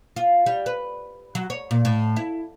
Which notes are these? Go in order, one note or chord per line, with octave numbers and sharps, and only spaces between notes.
F4
G3
B4
F#3
C#5
A#2
A2
E4